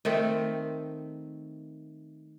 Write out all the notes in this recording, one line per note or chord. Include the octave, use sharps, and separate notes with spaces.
D#3 A3 C4